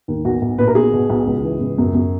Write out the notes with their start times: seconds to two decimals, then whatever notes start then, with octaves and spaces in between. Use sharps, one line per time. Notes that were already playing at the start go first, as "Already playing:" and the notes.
0.08 D#2
0.25 B1 F#4
0.42 B1
0.58 A#2 B4
0.67 A#4
0.75 B1 G#4
0.93 B2
1.10 B1
1.26 C#2
1.44 E3
1.60 C#2
1.78 F#2
1.95 F#2